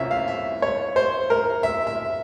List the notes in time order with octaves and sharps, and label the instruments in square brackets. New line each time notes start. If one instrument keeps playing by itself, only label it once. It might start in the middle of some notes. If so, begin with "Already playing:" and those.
Already playing: [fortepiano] C2 C3 F3 A#3 C#4 E5 F5
F5
E5
C#5
C5
A#4
E5
E5